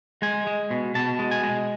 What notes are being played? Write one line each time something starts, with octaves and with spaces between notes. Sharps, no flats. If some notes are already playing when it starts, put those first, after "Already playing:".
G#3 G#5
G#3
B2
B2 A5
G#3
G#5
G#3